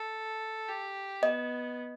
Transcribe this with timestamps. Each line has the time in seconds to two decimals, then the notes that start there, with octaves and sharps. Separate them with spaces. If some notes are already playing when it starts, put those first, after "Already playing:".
Already playing: A4
0.68 G4
1.22 B3 D#5